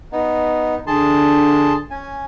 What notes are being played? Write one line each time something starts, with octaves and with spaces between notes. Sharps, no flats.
B3 D#4
D3 G#4 A5 C6
C#4 G#5